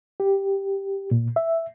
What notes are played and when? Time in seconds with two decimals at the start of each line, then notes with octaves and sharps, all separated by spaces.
0.20 G4
1.11 A#2
1.36 E5